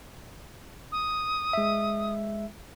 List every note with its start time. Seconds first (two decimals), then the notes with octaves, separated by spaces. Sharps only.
0.92 D#6
1.53 G#3 E5